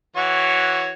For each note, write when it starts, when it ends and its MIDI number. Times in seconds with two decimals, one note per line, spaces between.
0.16 0.92 52
0.16 0.92 66
0.16 0.92 73